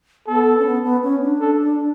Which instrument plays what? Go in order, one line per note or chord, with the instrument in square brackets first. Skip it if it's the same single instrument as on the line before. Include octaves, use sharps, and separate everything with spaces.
[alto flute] B3 [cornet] A4
[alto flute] C#4
B3
B3
C#4
D4
[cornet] A4